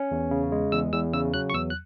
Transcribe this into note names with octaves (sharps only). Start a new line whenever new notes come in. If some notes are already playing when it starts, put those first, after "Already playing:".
Already playing: C#4
E2
C#3
G#3
E2 E6
E2 E6
C#3 E6
F#3 F#6
C#6
E2 E6
F#6